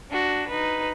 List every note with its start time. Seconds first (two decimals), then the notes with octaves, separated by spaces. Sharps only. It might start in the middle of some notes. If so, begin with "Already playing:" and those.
0.10 D4 F#4
0.48 D#4 B4